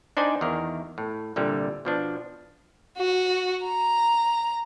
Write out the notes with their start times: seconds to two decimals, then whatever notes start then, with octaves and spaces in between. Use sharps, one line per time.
0.17 D4 D#4 C5 D5 G#5
0.41 E2 D#3 A#4
0.98 A2
1.36 C2 A#2 D3 G3
1.85 B2 F3 D4
2.98 F#4
3.65 A#5